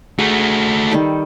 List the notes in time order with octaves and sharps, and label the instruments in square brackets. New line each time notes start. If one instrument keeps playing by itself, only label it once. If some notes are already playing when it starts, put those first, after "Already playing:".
[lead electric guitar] A3 F#4 [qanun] G#4
[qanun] D#3 G3 A4